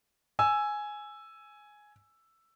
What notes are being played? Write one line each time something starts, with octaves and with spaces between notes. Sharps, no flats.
G#5 E6